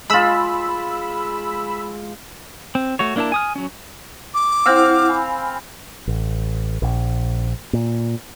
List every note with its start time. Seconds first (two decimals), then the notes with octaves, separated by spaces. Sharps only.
0.10 G#3 F4 B5 E6
2.75 C4
2.99 A3 F#4 C#5
3.16 A#3 D4 E4 A#4 A5
3.32 G#5 D#6 F6
3.56 F#3 C#4
4.34 D6
4.66 C4 E4 F5 F#5 E6
5.09 G#5 B5
6.07 A1
6.82 A#1
7.73 A#2